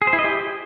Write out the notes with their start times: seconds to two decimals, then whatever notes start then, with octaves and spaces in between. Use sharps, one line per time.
0.02 G#4
0.07 C5
0.13 E4
0.19 D#5
0.24 G4